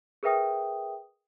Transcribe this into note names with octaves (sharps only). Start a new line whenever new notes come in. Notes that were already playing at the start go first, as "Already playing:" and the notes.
G#4 A#4 B4 E5 G5 D#6